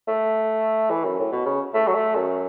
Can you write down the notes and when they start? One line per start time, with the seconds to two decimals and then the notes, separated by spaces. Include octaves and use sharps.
0.08 A3
0.90 E3
1.04 F#2
1.19 A2
1.32 B2
1.46 C#3
1.74 A3
1.87 F#3
1.94 A3
2.15 F#2